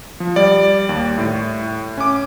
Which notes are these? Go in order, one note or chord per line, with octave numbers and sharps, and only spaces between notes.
F3
G3 D5
D#2
A2
C#4 D6